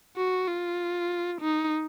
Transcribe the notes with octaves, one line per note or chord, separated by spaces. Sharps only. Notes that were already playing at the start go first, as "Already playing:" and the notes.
F#4
F4
D#4